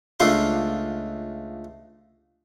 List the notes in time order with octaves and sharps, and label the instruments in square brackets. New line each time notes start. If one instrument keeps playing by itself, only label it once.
[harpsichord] C#2 A3 D4 F4 F5 C6